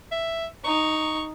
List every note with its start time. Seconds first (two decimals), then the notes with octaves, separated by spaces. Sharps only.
0.12 E5
0.64 D#4 C#6